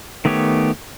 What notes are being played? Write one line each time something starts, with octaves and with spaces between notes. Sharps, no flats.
D#3 A3 B3 G4 C#5